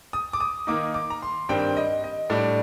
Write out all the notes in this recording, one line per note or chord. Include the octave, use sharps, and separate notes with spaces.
D#6
D6
D#6
D#3 A#3 D#4 D6
D6
A#5
C6
G2 D#3 G3 C4 G5
D#5
D#5
A2 G3 D4